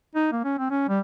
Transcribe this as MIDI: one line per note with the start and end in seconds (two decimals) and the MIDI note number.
0.15 0.27 63
0.32 0.40 58
0.44 0.54 61
0.58 0.70 60
0.70 0.86 61
0.88 1.00 55